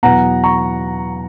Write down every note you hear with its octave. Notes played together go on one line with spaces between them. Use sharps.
E2 B2 F#3 B3 F#5 A#5
A#5 C#6